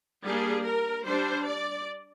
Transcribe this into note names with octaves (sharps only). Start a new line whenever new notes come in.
G3 A#3 D4 G#4
A#4
G3 D4 C5
D5